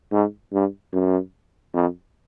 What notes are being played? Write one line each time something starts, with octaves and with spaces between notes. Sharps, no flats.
G#2
G2
F#2
F2